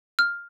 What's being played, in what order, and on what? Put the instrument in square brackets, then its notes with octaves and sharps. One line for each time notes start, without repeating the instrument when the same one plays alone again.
[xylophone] F6